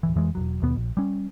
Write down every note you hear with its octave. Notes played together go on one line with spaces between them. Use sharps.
D1 D#2 E3
F2 E3 G#3
E1 D#2 F#3
D#2 B2 B3
A#1
G3 C#4